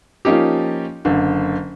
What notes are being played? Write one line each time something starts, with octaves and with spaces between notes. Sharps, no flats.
F3 A#3 C#4 D#4 G4
F#1 D3